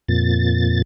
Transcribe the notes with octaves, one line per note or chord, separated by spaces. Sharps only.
F2 A#2 A6